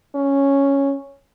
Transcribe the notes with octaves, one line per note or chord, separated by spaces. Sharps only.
C#4